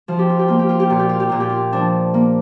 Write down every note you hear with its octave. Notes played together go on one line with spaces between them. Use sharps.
F3 F4
G4
F4
G4
A#3 F4
G4
F4
G4
A#2 F4
G4
F4
G4
A#2 F4
G4
F4
F3 D4
A#3